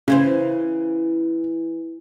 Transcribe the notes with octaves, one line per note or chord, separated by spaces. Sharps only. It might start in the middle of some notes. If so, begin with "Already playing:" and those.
C#3 E3 E4 C5